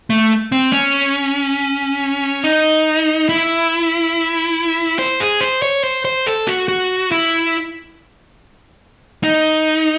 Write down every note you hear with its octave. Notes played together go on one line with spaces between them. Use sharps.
A3
C4
C#4
D#4
E4
C5
G#4
C5
C#5
C5
C5
A4
F#4
F#4
E4
D#4